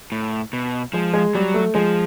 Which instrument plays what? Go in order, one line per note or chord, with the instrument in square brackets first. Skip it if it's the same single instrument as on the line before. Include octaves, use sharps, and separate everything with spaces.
[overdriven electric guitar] A2
B2
[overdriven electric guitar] F3 [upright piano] G#3
[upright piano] G#3
[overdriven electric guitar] F#3 [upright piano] G3
[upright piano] A3
[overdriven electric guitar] F3 [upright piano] G#3